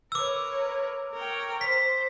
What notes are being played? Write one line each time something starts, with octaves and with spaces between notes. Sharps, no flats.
A#4 B4 C#5 D6 E6
A#4 C#5 G5
C5 B6